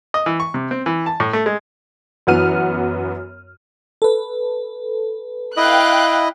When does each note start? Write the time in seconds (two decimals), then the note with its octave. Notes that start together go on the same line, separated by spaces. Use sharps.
0.14 D#5
0.26 E3
0.40 C#6
0.54 C3
0.71 C4
0.86 E3
1.06 A5
1.20 A2
1.33 A3
1.46 G#3
2.27 F#2 E3 B3 F#4 F6 D#7
4.02 A4 B4
5.57 E4 D#5 F5 G5 F#6